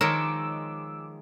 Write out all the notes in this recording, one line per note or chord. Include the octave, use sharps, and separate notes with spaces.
D#3 F3 G#3 A#4 C#5 D6 E6